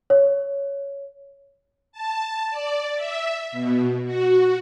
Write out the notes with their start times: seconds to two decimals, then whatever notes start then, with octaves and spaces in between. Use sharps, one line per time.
0.10 C#5
1.92 A5
2.50 D5
2.96 E5
3.52 B2
4.05 F#4